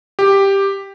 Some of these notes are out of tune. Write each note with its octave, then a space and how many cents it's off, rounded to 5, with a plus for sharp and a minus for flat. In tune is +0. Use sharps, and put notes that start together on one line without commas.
G4 +5